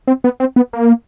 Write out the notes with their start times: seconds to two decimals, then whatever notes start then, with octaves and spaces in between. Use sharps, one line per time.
0.07 C4
0.24 B3
0.40 C4
0.56 B3
0.73 A#3